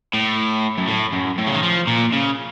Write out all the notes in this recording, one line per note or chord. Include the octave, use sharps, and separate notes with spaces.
A2
F#2
A2
F#2
A2
C#3
D#3
F3
A#2
C#3